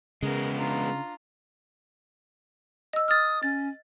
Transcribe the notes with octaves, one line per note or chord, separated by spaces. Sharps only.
C#3 G#3 B3 A#4
D4 F4 A#5
D#5 E6
D#6 F6 A6
C#4 A6